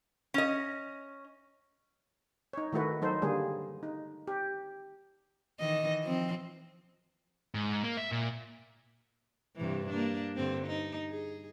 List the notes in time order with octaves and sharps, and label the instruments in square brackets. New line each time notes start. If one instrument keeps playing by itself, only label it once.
[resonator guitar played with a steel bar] C#4 D#5
[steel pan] D#4 C#5
D#3 A3 E4 F#4 B4
F#3 D#4 A4 C5
D3 G3 A#3 G#4
D#4
G4
[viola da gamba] D#3 E3 D#5
F3 C4
[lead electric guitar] G#2
A#3
E5
A#2
[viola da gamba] G2 C3 E3
A#3 D4
G2 D3 C4
D#4
G#4